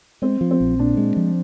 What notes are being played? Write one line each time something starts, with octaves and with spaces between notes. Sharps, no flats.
G#3 C4
F3
C4
A#1
A#2 D4
G#3
F3